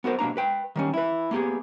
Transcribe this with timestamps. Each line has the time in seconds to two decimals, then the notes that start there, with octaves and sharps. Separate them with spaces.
0.04 B3 F#4 A#4 C5
0.19 B2 A#3 D4 A#5
0.37 B4 G5
0.76 D#3 G3 C#4
0.94 E4 B4
1.31 A#3 B3 G4 G#4